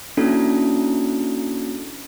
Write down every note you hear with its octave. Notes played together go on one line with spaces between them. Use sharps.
A#3 C#4 D4 E4 F#4 A4